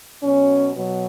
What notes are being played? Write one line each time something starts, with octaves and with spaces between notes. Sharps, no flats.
B2 F#3 C#4
B2 F#3